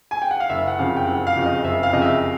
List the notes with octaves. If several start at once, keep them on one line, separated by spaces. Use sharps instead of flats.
G#5
G5
F#5
F5
F#1 E5
F#5
F2 C#3 F5
G5
F#1 F#5
F5
F2 C#3
D#5
F#1 E5
F5
F2 C#3 D#5
E5